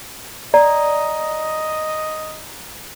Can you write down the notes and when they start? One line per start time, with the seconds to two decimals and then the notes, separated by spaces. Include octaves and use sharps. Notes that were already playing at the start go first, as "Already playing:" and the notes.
0.54 D5 D#5 A#5